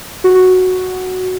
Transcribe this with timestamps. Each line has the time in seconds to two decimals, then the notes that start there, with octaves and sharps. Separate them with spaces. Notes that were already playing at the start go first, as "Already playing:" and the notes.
0.24 F#4